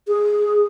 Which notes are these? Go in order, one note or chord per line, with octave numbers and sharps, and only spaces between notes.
G#4